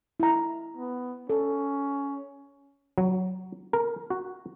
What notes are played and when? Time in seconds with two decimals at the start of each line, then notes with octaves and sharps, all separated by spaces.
0.20 E4 A#5
0.77 B3
1.30 C#4 A4
2.98 F#3
3.73 A#4
4.10 F#4